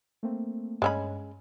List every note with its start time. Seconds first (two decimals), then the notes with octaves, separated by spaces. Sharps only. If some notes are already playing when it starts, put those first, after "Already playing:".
0.23 A3 A#3 C4
0.82 G2 G#3 C#4 B5